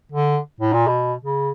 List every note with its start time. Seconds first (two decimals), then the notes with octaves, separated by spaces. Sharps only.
0.12 D3
0.60 A2
0.73 A#2
0.87 B2
1.25 C#3